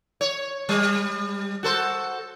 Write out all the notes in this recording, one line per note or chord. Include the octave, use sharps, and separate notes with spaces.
C#5
G3
F#4 A4 C5